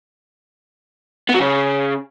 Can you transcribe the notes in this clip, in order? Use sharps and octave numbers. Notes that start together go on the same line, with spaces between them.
B3
F#3
C#3